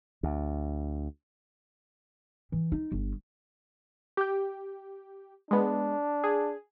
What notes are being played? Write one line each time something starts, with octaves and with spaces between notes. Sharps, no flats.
D2
E3
D#4
G1
G4 G5
G#3 B3 D4
G#4